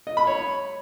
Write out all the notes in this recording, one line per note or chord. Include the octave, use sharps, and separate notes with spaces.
D#5
B5
C#5